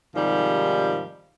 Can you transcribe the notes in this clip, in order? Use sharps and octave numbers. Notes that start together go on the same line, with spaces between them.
G#2 C3 D#3 F3 G3